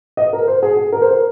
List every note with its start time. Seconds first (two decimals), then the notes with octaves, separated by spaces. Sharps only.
0.17 D#5
0.33 A#4
0.48 C5
0.63 G#4
0.77 G#4
0.92 A#4
1.02 C5
1.11 A#4